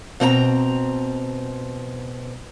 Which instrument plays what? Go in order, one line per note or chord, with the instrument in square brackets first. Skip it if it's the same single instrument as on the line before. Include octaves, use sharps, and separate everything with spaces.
[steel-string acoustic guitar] B2 C4 D5 A#5